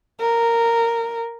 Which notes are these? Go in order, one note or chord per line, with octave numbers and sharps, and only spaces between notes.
A#4